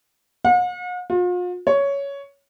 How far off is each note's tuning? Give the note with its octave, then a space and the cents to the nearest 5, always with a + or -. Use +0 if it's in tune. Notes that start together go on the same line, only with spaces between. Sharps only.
F#5 -45
F4 +40
C#5 +10